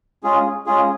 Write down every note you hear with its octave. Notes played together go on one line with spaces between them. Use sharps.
G#3 C#4 F4 G#4
G#3 C#4 F4 G#4